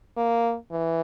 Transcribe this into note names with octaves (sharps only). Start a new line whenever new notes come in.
A#3
E3